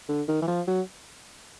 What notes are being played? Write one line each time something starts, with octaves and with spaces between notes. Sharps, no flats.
D3
D#3
E3
F3
F#3